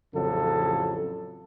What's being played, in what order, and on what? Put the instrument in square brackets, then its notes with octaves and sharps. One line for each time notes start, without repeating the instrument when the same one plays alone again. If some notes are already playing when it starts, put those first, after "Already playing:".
[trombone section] A1 F2 C#3 F#3 A4